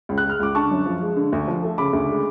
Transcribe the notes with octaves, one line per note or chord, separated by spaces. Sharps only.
C#2
F#6
G#3
F6
C#2 D6
D3 A5 C#6
F#2
F3
G#3
D3
D2
F3
A3
C#3 B5 D6
D2
G#3